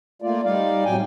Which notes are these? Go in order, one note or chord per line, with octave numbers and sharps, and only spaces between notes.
A3 A#3 F4 D5
G3 D#4 D5 F5
A2 C3 F#3 G3 G5 G#5